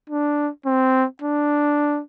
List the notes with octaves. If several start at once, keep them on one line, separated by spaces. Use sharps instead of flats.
D4
C4
D4